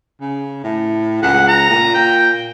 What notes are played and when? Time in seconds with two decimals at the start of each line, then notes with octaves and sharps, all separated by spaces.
0.21 C#3
0.64 A2
1.22 C#2 F#5
1.48 A#5
1.70 A#2
1.94 G5